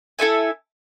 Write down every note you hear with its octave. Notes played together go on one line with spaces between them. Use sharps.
E4 A4 E5 G#5